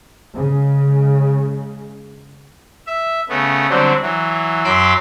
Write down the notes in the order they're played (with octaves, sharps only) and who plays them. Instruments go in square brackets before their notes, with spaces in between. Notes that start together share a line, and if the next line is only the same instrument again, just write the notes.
[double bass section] C#3 G#3
[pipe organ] E5
C#3 A3 B3
D3 F#3 G3 C4 D4
E3 F#3
F#2 F#3 B5 C6 D6 E6